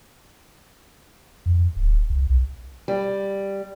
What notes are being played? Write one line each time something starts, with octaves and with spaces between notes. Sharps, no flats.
F2
D1
C#2
B1
G3